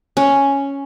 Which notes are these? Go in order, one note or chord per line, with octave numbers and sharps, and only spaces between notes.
C#4